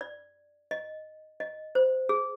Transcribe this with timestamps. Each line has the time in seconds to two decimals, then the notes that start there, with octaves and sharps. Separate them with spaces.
0.01 D5
0.71 D#5
1.40 D#5
1.75 C5
2.09 G#4